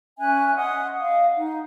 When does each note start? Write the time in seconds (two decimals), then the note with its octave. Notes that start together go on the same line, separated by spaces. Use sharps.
0.18 C#4 E5 G#5 F#6
0.57 D#5 F#5 C6 D#6
1.00 D#5 F5
1.37 D#4